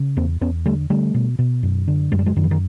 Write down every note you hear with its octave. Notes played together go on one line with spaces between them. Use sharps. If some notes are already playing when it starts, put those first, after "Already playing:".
Already playing: C#3
E2 A#3 C4
E2 B3 C#4
D3 G3 A3
D3 G3 A3
B2
B2
F#2
D3
F#2 G#3
G3
F#3 G#3
F#2 D#3
E3
D#3